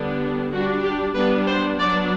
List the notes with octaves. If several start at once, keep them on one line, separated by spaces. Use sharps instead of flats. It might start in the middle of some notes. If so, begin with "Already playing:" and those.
Already playing: D3 G3 B3 D4
G3 D4 F#4
G4
G3 B3 D4 B4
C5
F#3 B3 D4 D5